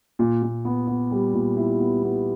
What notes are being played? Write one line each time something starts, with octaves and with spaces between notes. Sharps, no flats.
A#2
A#2
B3
B3
G3
A#2
E4
B3
B3